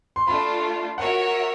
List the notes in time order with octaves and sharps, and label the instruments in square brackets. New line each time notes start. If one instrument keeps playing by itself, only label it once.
[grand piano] C6
[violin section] A3 D4 F4 [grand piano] B5
[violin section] F#4 A#4 C#5 E5 [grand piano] F#5